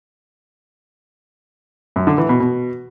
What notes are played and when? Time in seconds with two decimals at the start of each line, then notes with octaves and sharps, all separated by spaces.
1.96 F#2
2.07 D3
2.18 E3
2.29 B2
2.40 B2